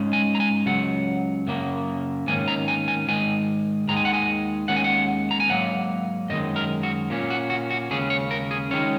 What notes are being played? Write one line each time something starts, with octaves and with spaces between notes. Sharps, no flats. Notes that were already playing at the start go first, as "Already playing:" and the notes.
Already playing: G#2 G#3 C#4
G#5
A#5
G#5
C#2 C#3 F#3 F#5
F#2 C#3 A#3
G#2 D#3 A#3 C#4 G#5
A#5
G#5
G#5
G#2 D#3 G#3 G#5
D#2 D#3 G#3 A#5
G#5
F#5
G#5
D#2 D#3 G#3 C#4 F#5
G#5
F#5
A#5
G#5
G#2 F#3 A#3 F#5
F#2 D#3 G#3 D#5
A#4
F#4
A#2 A#3 C#4
F#4
F#4
F#4
D#2 C#3 G#3 C#4 G#4
C#5
A#4
G#4
D#3 G#3 C#4 C#5